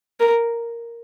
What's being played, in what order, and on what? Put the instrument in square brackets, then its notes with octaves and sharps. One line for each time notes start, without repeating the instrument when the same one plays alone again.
[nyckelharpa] A#4